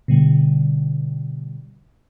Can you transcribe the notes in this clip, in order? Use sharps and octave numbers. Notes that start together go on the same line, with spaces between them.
B2 D3 G3